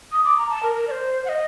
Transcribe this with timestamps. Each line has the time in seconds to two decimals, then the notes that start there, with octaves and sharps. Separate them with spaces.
0.12 D#6
0.24 D6
0.38 A#5
0.49 A5
0.63 A#4
0.75 A#4
0.87 D5
0.91 C5
1.25 F#5
1.29 D#5